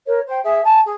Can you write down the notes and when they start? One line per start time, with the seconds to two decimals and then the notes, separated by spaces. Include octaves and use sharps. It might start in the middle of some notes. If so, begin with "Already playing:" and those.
0.06 A#4 C#5
0.26 C5 G5
0.43 G#4 E5
0.64 G#5 A5
0.84 G#4